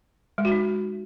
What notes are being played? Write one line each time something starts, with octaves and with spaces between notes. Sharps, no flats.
G#3
F#4
D#4